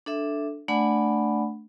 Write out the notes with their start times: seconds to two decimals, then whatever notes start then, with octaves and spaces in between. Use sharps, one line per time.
0.06 D4 A4 E5
0.68 A3 D4 D5 F#5 G#5 B5